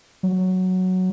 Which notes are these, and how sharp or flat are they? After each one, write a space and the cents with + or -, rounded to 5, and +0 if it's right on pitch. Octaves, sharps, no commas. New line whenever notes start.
F#3 +0